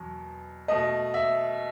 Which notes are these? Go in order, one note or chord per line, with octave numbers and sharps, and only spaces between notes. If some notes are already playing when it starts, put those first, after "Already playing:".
Already playing: E2 B2 F#3
B2 A3 D#5
E5